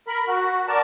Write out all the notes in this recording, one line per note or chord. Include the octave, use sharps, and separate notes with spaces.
A#4 B5
F#4
A#4 D5 A5